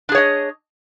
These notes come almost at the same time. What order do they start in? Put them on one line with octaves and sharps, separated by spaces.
D4 G#4 C#5 D#5